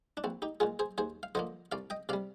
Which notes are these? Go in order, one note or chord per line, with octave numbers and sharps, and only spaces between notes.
D4
A#1 C4
D#4 G4
A#2 G#3 F4 G#4
G#4 C5
D#2 G#4 C5
F5
D3 F3 A#3 C5 D#5
C2 D5 F5
D#5 G5
C3 G3 D5 F5